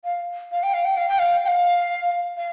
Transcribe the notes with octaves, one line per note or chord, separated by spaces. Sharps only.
F5
F5
G5
F5
G5
F5
G5
F5
G5
F5
F5